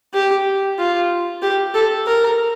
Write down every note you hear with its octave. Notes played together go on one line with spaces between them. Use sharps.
G4
F4
G4
A4
A#4